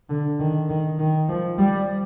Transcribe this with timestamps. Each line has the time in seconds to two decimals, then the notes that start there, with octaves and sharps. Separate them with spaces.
0.10 D3
0.40 D#3
0.70 D#3
0.99 D#3
1.29 F3
1.58 G3